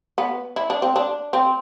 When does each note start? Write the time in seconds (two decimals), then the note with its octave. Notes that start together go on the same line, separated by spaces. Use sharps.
0.18 B3
0.56 E4
0.70 D4
0.82 C4
0.96 D4
1.33 C4